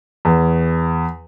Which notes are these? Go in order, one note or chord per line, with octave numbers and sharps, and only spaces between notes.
E2